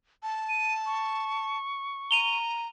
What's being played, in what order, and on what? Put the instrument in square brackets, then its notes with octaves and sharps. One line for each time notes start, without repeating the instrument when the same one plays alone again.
[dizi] A5
[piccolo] D#7
C#6
[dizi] A#5 [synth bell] D#7 F7 G7